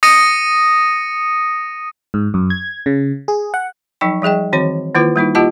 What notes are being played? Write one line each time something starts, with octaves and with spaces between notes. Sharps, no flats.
D#6 A#6 C#7 D#7
G#2
F#2
G#6
C#3
G#4
F#5
F3 F#3 D#4 G5 C#6
F3 G3 G#4 D#5 G5
D#3 E3 C4 F#4 C#5
D#3 A#3 E4 F4 B4
G3 A#3 D#4 E4
A#3 E4 F4 G4 D#5 A5